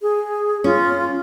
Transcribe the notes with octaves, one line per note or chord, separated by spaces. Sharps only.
G#4
C#4 F4